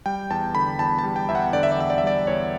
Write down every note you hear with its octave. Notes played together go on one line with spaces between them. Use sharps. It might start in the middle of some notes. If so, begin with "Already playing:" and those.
G3 G5
E2 A5
D3 B5
E2 A5
A5
G3
G5
E2 E5
F#5
D3 D5
E5
D5
E2 E5
D5
E5
G3 D5
E2 C#5